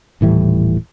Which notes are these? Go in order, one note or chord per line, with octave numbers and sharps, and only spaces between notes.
D#1 A2 E3 G3